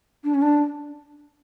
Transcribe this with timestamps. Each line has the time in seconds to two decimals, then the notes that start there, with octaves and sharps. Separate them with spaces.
0.24 D4
0.34 C#4
0.42 D4